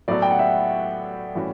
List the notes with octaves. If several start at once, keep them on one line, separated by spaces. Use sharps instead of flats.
A2 F#3 B3 F#4 A4 D5
G5
F#5
E5
A2 E3 G3 C#4 F#4